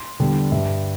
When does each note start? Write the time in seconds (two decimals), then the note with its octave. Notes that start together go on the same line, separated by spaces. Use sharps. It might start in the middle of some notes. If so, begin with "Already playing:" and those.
Already playing: C6
0.19 E2 D3 G3
0.52 G2 G3 E5